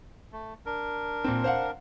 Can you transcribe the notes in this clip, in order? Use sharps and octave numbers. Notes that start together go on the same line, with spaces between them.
A3
D4 A#4
A#2 C4
C5 F5 F#5